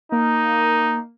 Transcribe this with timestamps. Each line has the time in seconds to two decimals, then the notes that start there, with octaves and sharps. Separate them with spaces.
0.12 A#3 D#4